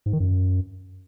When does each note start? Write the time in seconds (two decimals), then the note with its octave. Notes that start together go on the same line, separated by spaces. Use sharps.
0.06 G#2
0.13 D#3
0.20 F#2